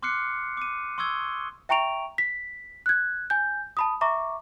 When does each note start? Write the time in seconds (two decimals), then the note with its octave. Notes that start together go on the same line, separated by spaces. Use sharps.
0.03 C6 D6 F6 F#6 C7 C#7
0.57 D6 D#7
0.98 C6 C#6 D#6 E6 G#6 G7
1.69 E5 G5 A#5 C#6 D7 F7
2.18 B6
2.86 F#6 G#6
3.30 G#5 G6
3.77 A5 B5 D#6
4.01 E5 A#5 C#6 D6